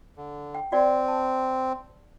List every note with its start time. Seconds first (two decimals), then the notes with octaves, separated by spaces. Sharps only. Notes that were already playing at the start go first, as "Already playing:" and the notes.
0.17 D3
0.55 G5
0.72 C4 F#4 D5 G5
1.08 A5